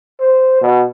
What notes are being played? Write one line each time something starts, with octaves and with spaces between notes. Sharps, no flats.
C5
B2